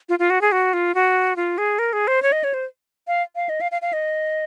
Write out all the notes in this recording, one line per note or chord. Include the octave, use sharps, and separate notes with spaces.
F4
F4
F#4
G#4
F#4
F4
F#4
F4
G#4
A#4
G#4
C5
C#5
D#5
C#5
C5
F5
F5
D#5
F5
F5
F5
D#5